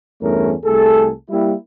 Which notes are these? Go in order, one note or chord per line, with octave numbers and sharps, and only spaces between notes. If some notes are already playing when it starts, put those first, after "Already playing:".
E2 G2 A3 C#4 A#4
C2 A3 G#4 A4
G3 A#3 E4